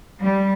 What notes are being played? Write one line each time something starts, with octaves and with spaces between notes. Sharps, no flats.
G3